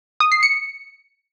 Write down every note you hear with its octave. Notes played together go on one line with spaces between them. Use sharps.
D#6
C7
C#7